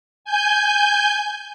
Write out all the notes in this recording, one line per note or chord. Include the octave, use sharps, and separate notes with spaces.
G#5 G6